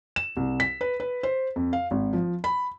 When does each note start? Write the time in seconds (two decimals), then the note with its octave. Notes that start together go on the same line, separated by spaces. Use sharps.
0.16 E7
0.37 C2
0.60 B6
0.81 B4
1.00 B4
1.23 C5
1.56 F2
1.73 F5
1.91 G#1
2.13 F3
2.44 B5